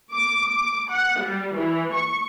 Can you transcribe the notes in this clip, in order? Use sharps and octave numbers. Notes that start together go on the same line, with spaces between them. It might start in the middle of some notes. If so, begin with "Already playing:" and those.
D6
D6
F#5
G3
E3
C#6